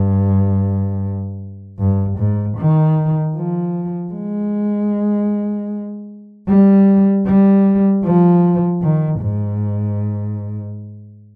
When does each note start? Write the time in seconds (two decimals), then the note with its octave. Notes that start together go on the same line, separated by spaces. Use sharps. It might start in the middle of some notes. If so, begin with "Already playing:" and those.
Already playing: G2
1.79 G2
2.18 G#2
2.58 D#3
3.36 F3
4.13 G#3
6.48 G3
7.26 G3
8.05 F3
8.82 D#3
9.21 G#2